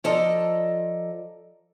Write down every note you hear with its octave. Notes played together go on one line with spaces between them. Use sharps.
F3 F4 A4 D5 D#5 A#5